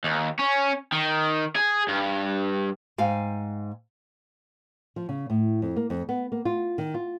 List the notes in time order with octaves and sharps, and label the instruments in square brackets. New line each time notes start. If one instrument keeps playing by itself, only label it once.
[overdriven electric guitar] D#2
C#4
D#3
G#4
G2
[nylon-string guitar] G#2 F5 G5 G#5
F3
C#3
A2
F2
A#3
F2
B3
A#3
F4
D#3
F4